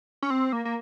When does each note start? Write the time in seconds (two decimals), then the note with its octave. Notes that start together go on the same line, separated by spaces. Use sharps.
0.22 C#4
0.30 C4
0.53 A#3
0.65 A#3